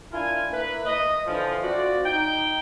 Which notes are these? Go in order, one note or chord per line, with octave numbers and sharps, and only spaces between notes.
D4 E4 F4 A#4 G#5
A#3 E4 B4
D#5
D3 E3 F3
C4 F4 F#4 D5
D#4 G5